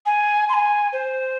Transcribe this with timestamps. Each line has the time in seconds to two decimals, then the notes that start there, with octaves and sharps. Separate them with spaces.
0.06 G#5
0.49 C6
0.54 G#5
0.93 C5